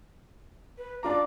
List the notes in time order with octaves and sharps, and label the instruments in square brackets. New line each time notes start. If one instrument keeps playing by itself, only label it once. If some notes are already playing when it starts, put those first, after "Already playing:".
[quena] B4
[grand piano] D4 F4 A#5 [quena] D6